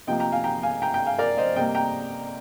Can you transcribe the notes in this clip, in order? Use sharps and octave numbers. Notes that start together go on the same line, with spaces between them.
C3 F3 A#3 D#5 G5
G5 A#5
F5 G#5
G5 A#5
F5 G#5
G5 A#5
G5 A#5
F5 G#5
A#4 D5
C5 D#5
C3 G3 A#3 D#5 G5
G5 A#5